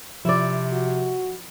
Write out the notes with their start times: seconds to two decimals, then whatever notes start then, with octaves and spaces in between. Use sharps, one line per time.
0.25 C3 F3 E4 D5
0.73 F#4